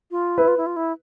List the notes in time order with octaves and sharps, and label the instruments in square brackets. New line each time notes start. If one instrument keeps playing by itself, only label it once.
[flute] F4
[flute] E4 [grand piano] B4
[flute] F4
E4
F4
E4